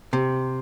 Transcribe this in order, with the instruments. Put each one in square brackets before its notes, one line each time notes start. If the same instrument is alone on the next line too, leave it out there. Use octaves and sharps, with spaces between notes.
[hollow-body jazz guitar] C3